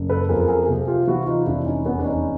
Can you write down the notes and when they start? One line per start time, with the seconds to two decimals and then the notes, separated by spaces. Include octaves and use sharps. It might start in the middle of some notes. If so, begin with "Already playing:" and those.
Already playing: F#1
0.10 A4 B4
0.29 F2 G#4 A#4
0.40 A4
0.48 G#4 A#4
0.68 C3 G4 A4
0.87 F4 G4
1.07 E3 E4 F#4
1.26 D#4 F4
1.46 F1 D4 E4
1.66 C#4 D#4
1.85 E2 B3 C#4
1.99 D4
2.05 C#4 D#4